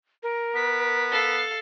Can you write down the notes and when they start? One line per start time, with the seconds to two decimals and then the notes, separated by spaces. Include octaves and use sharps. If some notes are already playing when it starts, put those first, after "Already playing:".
0.23 A#4
0.55 B3 B6
1.11 A4 F5